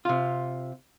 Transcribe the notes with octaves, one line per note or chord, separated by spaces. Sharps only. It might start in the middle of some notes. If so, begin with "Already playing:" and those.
C3 F4